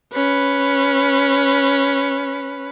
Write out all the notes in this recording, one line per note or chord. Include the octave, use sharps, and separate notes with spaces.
C#4 B4